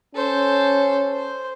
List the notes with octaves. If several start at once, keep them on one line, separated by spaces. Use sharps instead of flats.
C#4 A4 C5
C5